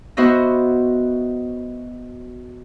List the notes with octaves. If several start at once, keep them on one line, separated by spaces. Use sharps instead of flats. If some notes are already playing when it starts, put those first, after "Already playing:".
B3 F#4 C5 D#5 E5